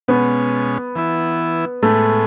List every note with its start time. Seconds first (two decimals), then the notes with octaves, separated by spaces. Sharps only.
0.08 B2 G#3 B3 C#4
0.96 E3 B3 E4
1.83 A2 G#3 A3 B3